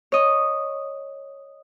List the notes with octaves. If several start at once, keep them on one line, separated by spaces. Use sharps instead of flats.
C#5 D#5